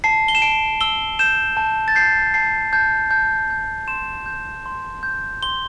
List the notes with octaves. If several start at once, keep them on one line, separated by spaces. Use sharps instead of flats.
A5 C7
G7
E7
A5 D7
E6 G7
G6 E7
A5
A6
G6 C7
A5 C7
A5 G6
A5 G6
G6
C6 E7
G6
C6
G6
C6 G7